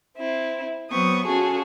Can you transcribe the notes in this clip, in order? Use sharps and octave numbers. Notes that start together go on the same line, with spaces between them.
C4 E4
F#3 B3 C4 C#6 D#6
C#4 F4 F#4 G#4 A4